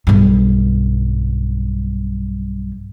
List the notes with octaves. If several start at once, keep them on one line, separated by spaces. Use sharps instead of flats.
B1 G2